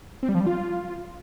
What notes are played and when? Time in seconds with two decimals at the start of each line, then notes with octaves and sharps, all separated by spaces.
0.23 C4
0.29 G3
0.35 F3
0.41 G3
0.46 F4